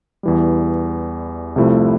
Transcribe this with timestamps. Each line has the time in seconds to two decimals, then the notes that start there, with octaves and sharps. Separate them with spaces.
0.23 E2 E3 G3
1.56 C2 C3 F3 A3 E4